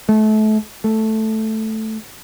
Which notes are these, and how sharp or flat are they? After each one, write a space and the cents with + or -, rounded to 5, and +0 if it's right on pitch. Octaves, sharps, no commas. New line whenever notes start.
A3 -30
A3 +0